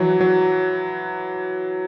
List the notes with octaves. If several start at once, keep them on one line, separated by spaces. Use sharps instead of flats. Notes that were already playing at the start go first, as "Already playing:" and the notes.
Already playing: E3 F#3
F#3